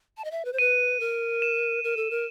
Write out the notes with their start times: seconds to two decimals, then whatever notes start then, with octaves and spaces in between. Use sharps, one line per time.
0.17 A5
0.24 D#5
0.31 E5
0.45 B4
0.53 C5
0.59 B4 D#7
1.00 A#4
1.42 E7
1.84 A#4
1.97 A4
2.11 A#4